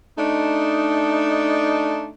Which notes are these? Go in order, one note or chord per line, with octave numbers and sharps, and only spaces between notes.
A3 D4 D#4